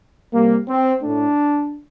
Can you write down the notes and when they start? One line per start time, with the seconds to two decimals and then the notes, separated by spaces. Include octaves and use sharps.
0.34 C3 G3 A#3
0.69 C4
1.03 A2 A3 D4